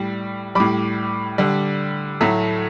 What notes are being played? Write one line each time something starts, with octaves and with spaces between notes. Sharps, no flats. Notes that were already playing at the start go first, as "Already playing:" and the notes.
Already playing: A2 G3
A2 G3 B5 D6
D3 G3
A2 F#3 A3